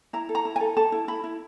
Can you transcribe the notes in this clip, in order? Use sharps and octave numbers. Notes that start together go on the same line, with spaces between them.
E4 A#5
A4
A#5
E4
G#5
A4
A4 A5
E4
E4 B5
E4